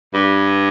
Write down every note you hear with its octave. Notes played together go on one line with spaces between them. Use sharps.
G2